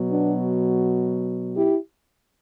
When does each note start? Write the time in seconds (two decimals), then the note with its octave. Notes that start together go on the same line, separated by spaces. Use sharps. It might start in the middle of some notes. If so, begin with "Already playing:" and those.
Already playing: B2 F#3
0.11 B3 D4
1.56 E4 G4